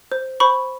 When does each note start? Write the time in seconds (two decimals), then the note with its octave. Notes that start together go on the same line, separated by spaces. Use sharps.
0.12 C5
0.40 C5 B5 C#6